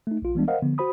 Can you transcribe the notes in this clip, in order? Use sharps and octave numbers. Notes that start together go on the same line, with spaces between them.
A3 D#4
A#1 F4
E3 G3 G#3 B3 D4
A#4 C5 D#5 F5 F#5
D3 F3 B3
F#4 C5 B5 D#6